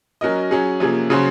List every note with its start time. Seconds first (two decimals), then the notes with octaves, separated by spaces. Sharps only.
0.21 F#3 C#4 F#4 A#4 D#5
0.51 F#3 C#4 G#4
0.80 C3 F3 A#3 C#4 G#4
1.10 C#3 F#3 C#4 F#4 C5